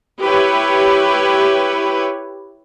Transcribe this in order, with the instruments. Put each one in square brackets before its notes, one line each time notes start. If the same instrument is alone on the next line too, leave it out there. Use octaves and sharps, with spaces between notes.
[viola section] E4 G4 B4 C#5